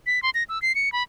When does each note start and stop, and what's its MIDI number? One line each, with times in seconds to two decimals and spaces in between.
0.07 0.22 95
0.23 0.30 84
0.35 0.43 94
0.49 0.61 88
0.62 0.75 96
0.75 0.92 97
0.92 1.03 83